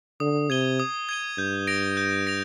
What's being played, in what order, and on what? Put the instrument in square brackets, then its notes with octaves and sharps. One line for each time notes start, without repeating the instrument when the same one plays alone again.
[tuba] D3 [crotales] D#6
[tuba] C3 [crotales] G#6 D#7 G7
[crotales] D#6
G#6 D#7 G7
[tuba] G2 [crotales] G6
[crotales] A#6 D7 F7
G6
A#6 D7 F7